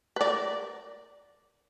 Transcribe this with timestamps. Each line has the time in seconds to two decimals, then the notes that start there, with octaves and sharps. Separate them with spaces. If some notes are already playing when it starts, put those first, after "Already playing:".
0.16 B4
0.21 A#4 D5